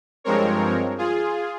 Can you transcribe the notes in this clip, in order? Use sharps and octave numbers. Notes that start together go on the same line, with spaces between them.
G2 F3 G#3 C4 A#4 C#5
F4 G#4